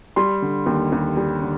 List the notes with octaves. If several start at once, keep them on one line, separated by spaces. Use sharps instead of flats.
G3 C6
D3
D#2
D#2
G3
D3